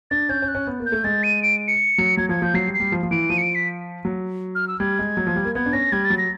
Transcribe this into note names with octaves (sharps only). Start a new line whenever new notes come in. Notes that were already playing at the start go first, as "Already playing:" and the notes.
D4 A6
C#4 G6
C#4
F#6
C#4
B3
A#3
G6
A3
G#3 A6
D#7
D7
C#7
F#3
F#3 G#6
F3 G#6
F3 G6
F#3 C7
G3
C7
G3
F3
F3
E3 D7
F3 D#7
C#7
D7
B6
F#3
F6
E6
G3 G#6
G#3
F#3
F3
G3
A#3
B3 G#6
D4
C#4 A#6
G3 G#6
A6
F#3
A#6